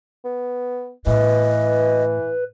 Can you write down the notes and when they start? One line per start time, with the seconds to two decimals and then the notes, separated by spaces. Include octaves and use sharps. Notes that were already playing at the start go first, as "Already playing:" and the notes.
0.25 B3
1.06 A2 E3 B4 D#5